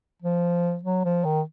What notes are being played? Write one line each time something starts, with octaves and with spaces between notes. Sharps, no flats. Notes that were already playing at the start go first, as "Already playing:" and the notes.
F3
F#3
F3
D#3